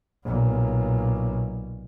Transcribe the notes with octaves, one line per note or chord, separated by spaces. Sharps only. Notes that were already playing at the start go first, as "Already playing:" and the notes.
B1 A#2